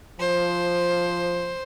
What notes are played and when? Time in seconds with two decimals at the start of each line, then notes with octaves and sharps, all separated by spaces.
0.20 F3 C5